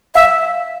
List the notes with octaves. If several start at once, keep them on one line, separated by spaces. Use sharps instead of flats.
E5 F5